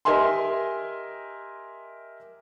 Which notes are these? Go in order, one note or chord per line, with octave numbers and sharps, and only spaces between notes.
G4 A#4 D#5 E5 G#5 C6